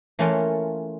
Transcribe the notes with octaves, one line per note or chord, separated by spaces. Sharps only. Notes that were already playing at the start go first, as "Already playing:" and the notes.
E3 A3 A#3 C#4 F4